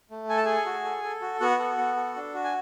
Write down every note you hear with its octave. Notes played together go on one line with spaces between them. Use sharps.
A3
A4 G#5
A5
G#4 A4 G#5
F#4
A4
A4
F#4
B3 F#4 F#5
A4
B3
A4
D4
F#4
G#5